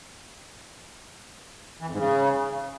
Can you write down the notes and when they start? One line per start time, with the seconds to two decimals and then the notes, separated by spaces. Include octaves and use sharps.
1.81 E3
1.87 F2
1.92 G#2
1.98 C#3